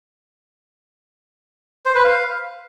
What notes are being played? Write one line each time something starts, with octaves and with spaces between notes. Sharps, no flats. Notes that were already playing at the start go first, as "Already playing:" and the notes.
C5
B4
F5